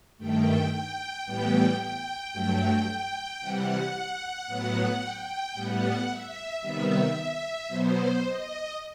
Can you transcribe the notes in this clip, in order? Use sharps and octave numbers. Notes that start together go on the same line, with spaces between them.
G2 D#3 A3 G5
G5
A2 E3 G3 B3 G5
G5
G2 F#3 A3
C3 E3 G3 F#5
A2 F#3 B3
G5
A2 G3 B3 F#5
E5
C3 D#3 G3 B3 E5
B2 F#3 B3 C5
D#5